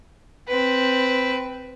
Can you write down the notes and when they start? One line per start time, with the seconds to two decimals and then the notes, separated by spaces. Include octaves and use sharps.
0.48 C4 B4